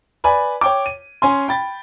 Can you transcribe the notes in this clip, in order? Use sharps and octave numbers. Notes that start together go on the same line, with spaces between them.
B4 D5 G#5 B5
C#5 G5 D6
D#7
C#4 G#5 C6
G5 B5 A6